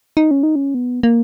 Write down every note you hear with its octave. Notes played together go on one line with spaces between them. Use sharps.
D#4
C#4
D#4
C#4
B3
A#3